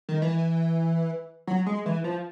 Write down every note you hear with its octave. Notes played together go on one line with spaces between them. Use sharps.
D#3
E3
F#3
G#3
E3
F3